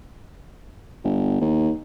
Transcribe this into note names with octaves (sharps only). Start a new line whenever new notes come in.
G1
D#2